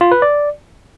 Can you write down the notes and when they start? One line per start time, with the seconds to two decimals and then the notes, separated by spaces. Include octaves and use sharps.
0.01 F4
0.12 B4
0.22 D5